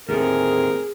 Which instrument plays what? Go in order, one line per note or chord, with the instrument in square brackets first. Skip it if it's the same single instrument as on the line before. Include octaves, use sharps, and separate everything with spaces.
[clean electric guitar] D#2 A2 D3 [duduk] C4 [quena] G#4 [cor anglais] A#4